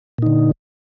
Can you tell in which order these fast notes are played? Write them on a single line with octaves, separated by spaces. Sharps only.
A#2 D#4 D3